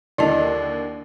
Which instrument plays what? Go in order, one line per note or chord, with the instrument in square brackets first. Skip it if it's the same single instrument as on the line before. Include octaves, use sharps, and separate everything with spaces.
[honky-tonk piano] D#2 D3 [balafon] E4 D#5 A5 [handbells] D5